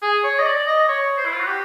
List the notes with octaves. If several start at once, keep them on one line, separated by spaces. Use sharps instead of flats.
G#4
C#5
D#5
D5
D#5
C#5
C5
E4
F4
F#4
G4